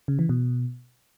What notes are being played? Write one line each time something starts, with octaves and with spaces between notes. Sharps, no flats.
C#3
E3
B2